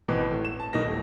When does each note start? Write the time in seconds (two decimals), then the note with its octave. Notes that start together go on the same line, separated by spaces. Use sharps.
0.08 G#1 B2 E3 C4 B4
0.31 A2
0.45 E7
0.60 A5
0.73 B1 B2 D#4 A#4 A#6
0.84 D#1 A2